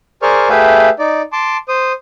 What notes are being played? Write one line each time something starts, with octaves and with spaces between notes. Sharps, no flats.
G#4 A#4 C5 D5 C#6 F6
A3 G4 G#4 B4 E5 F5
D#4 D5
A5 C6 D6
C5 D#6